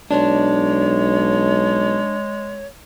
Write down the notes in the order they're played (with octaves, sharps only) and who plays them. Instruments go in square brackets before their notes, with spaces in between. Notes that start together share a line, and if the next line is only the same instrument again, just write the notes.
[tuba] B1 [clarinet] G#3 [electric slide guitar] D4 [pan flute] C#5